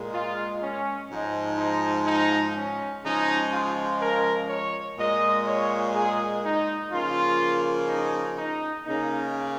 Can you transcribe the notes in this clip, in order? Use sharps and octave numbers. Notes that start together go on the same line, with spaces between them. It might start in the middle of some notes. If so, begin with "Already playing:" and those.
Already playing: A#2 G#3
F4
C#4
G#2 F3 G#3 D#4
D#4
D#4
C#4
C#3 F3 G#3 D#4
F4
A#4
C#5
A#2 G#3 D#5
C#5
G#4
D#4
C#3 F3 A#3 F4
D#4
D#4
C#3 A#3 D#4